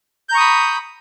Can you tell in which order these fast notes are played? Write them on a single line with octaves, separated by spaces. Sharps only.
G6 A#5 C#6 D#6 B5